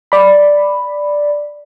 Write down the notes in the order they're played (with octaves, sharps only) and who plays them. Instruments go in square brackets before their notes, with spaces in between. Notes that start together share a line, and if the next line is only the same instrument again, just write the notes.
[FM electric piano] D5 B5